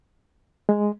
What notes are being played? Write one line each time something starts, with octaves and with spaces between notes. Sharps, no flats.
G#3